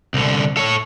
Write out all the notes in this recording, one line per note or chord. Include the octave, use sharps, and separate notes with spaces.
C2 D3
A4 C#5